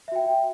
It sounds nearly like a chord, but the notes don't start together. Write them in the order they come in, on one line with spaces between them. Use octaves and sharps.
E5 F#4 G5